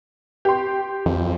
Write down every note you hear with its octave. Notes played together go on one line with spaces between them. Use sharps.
G4 C6
F2